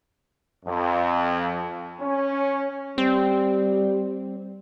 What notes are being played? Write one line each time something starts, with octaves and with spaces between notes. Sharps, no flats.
F2
C#4
G3 C4